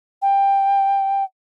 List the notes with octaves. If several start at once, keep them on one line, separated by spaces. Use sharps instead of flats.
G5